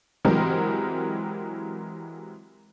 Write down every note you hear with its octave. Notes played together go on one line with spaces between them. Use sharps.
E3 F#3 G#3 C4 G4 A#4